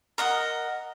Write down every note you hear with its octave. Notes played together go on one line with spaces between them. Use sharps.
A#4 D#5 F#5